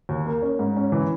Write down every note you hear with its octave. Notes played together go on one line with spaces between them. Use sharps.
D#2
A#3
C#4
G#2
C#4
E3